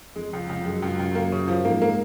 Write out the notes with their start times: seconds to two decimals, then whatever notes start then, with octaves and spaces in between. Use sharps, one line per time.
0.16 F2 G#3
0.33 C#2
0.49 C#2
0.65 F#2 G#3
0.82 C#2
0.99 C#2
1.15 A#3
1.32 C#3
1.48 F3
1.65 G#2 A#3
1.82 A#3